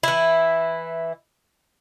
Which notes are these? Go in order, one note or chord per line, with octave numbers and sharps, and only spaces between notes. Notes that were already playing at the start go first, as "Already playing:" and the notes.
E3 E4